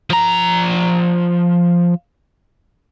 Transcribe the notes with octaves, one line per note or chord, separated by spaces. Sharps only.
F3 A#5